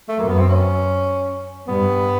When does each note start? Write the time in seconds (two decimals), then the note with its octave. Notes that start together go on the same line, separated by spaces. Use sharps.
0.09 A3
0.19 F#2 A#3
0.28 B3
0.39 C4
0.49 C#4
1.68 G2 B3